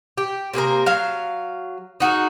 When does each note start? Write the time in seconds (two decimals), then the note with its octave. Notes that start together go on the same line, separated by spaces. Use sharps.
0.17 G4
0.53 C3 A#3 G#4 A#4
0.86 F#3 F5
2.00 D#4 F#4 G#4 A#4